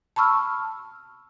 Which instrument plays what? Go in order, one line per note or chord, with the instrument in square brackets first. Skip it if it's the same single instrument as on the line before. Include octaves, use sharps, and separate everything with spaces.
[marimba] A5 B5 C#6 E6 F6